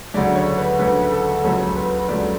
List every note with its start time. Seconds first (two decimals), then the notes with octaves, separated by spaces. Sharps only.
0.14 D2 C#3 F#3 A3 D5
0.35 C#5
0.58 B4
0.79 D2 C#3 F#3 A3 B4
1.12 A4
1.43 C#2 C#3 F#3 A3 A4
1.76 B4
2.08 C#2 C#3 F#3 A3 D5